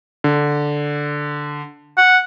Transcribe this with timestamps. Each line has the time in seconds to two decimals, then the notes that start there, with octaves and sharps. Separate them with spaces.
0.24 D3
1.97 F#5